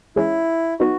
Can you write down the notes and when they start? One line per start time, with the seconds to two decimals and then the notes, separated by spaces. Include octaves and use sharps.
0.16 E3 G#3 C#4 E4
0.80 F#3 B3 D#4 F#4